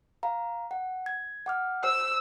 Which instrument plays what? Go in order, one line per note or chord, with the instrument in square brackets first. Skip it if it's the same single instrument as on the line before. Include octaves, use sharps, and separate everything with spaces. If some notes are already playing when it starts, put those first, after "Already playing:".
[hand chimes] F5 A#5
F#5
G#6
F#5 D6 F6
[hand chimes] C5 [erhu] E6